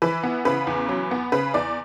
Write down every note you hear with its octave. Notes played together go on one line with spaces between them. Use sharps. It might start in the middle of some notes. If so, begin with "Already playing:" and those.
E3 B4
B3
C#3 B4
E2
F#3
B3
C#3 B4
E2 D5